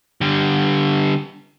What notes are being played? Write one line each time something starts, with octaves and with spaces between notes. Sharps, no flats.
D3 G3